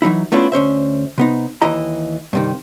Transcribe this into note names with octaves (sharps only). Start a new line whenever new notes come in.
E3 F#3 D#4 E4
A3 B3 C#4 D4 E4 F4
D2 C#4 C5 E5
C3 B3 D#4
D#2 E3 E4 D#5 A#5
G2 C3 D#3